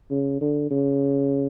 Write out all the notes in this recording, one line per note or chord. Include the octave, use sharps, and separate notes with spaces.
C#3
D3
C#3